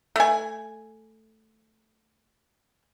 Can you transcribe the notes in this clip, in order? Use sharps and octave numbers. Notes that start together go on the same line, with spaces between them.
A3 G#5